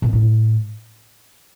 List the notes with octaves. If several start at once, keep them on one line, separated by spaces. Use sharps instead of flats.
A#2
A2